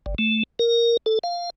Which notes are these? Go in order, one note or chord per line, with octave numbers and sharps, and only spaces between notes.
G1
A3
A#4
A4
F5